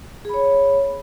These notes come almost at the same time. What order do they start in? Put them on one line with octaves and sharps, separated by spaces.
G#4 B5 C#5